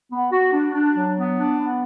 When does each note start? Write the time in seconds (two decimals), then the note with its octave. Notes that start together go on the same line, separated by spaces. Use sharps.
0.12 B3
0.32 F#4
0.53 D4
0.74 D4
0.94 F#3
1.16 B3
1.37 D4
1.57 B3